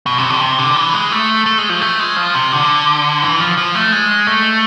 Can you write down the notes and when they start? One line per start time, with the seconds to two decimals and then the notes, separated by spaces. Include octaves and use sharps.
0.06 B2
0.18 C3
0.30 D3
0.41 C3
0.58 D3
0.76 E3
0.94 G#3
1.12 A3
1.46 A3
1.58 G#3
1.69 F3
1.81 A3
1.99 G#3
2.16 F3
2.35 C3
2.52 D3
3.22 E3
3.40 F3
3.58 F3
3.75 A3
3.92 G#3
4.27 A3